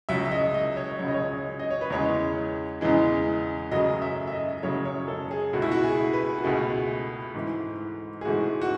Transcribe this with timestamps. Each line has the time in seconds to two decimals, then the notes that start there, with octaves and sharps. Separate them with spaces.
0.09 C#2 C#3 F#3 E5
0.25 E5
0.31 D#5
0.54 D#5
0.76 C#5
0.99 C#2 C#3 F#3 C#5
1.08 D#5
1.14 C#5
1.59 D#5
1.71 C#5
1.81 B4
1.90 E2 C#3 E3 G#3 C#5
2.81 E2 C#3 E3 G#3
3.71 F#2 C#3 F#3 A3 D#5
4.02 E5
4.27 E5
4.32 D#5
4.63 F#2 C#3 F#3 A3 C#5
4.85 C#5
5.08 A4
5.31 G#4
5.53 C#2 B2 A3 F#4
5.62 E4
5.72 F#4
5.84 G#4
6.13 B4
6.38 F#4
6.44 C#2 B2 A3 G#4
7.34 G#2 E3 A3
8.21 G#4
8.25 G#2 E3 A3 F#4
8.62 F#4